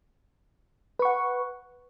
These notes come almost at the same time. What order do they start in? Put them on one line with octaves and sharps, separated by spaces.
B4 C#6 F#5